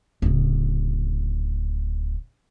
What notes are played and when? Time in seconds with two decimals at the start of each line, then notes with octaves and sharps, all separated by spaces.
0.22 D1 C#3